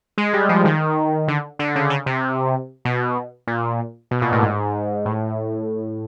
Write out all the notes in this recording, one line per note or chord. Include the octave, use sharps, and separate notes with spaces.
G#3
G3
F3
D#3
D3
D3
C#3
C#3
C3
B2
A#2
B2
A#2
A2
G#2
A2